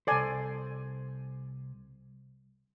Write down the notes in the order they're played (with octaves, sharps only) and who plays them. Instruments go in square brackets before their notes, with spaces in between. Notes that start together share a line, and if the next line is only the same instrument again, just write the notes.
[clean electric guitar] C2 C5 [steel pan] A4 D5 G#5